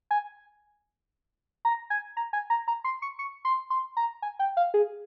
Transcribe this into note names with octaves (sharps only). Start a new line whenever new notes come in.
G#5
A#5
G#5
A#5
G#5
A#5
A#5
C6
C#6
C#6
C6
C6
A#5
G#5
G5
F5
G#4